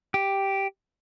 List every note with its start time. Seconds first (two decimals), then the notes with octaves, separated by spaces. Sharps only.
0.14 G4